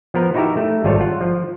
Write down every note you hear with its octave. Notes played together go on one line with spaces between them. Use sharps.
F3 B3 A#4
D#4 E4 F#4 G4 A#4 E5
A3
G#1 G3 F4 A4 C#5
F4 F#5
F3